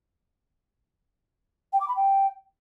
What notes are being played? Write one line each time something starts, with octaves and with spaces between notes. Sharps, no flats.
G5
D6
B5
G5